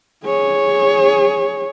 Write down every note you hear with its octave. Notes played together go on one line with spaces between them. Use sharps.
G#4 C#5